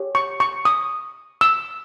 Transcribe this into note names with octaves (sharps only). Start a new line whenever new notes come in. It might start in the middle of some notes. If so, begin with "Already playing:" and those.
Already playing: G4 C#5
C#6
C#6
D#6
E6